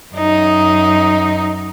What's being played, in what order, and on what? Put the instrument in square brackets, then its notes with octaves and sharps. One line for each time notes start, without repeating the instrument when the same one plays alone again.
[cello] F#2 D#4